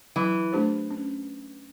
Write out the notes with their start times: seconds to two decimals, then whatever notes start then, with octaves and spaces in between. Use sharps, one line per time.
0.16 E3 F#3
0.52 A3 D4 G4 C5
0.91 C#4